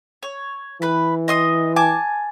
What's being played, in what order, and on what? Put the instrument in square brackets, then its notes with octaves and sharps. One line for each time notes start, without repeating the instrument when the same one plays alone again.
[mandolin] C#5
[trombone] E3 [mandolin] B4 B5
[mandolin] D#5 C6 D#6
G#5 A5 D6